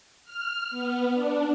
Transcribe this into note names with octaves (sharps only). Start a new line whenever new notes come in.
F6
B3
D4